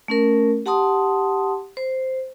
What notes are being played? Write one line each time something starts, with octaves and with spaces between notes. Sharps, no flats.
A3 C#4 A#4
G4 F#5 A5 C6 D#6
C5